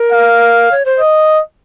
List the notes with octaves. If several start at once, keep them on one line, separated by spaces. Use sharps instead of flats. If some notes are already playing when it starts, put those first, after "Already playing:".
Already playing: A#4
F5
C#5
C5
D#5